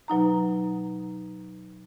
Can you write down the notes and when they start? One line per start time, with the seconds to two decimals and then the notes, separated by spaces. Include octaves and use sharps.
0.08 B2 F#3 D#4 A#5